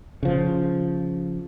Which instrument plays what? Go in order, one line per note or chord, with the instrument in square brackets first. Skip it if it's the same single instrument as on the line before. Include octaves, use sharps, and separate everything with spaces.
[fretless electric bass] C#3 F3